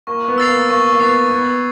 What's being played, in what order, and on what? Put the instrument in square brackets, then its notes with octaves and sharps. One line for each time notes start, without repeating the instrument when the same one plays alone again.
[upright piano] A#3 [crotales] C#6
[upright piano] B3
[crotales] E6 A6 C7 F7
[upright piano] A#3
[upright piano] A#3 [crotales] C#6
[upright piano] A#3
[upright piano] B3 [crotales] E6 A6 C7 F7
[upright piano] B3 [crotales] G#6